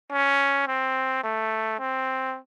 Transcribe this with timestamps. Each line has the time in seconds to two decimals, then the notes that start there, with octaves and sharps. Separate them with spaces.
0.12 C#4
0.67 C4
1.23 A3
1.79 C4